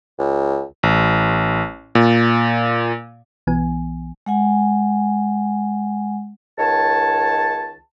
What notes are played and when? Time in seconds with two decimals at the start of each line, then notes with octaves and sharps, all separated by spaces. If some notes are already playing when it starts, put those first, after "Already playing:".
0.19 C#2
0.83 A1
1.95 A#2
3.47 B1 E3 B3 G#5
4.26 G#3 F#5 G#5
6.58 C#2 D#3 C#5 A5